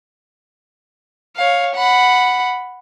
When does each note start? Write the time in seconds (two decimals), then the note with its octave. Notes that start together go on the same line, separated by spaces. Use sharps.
1.36 C#5 F5
1.75 F#5 B5